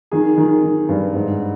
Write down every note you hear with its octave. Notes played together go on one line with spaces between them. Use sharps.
D#3 G#4
D#3
D#3
G2
G#2